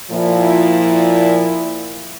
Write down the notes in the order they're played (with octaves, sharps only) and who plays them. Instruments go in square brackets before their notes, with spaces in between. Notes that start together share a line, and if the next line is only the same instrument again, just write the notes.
[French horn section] A#2 F3 E4